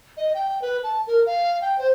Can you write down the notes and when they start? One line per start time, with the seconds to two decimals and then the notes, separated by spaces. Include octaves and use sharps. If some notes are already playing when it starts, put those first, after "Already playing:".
0.17 D#5
0.34 G5
0.62 B4
0.83 A5
1.07 A#4
1.26 F5
1.61 G5
1.79 C5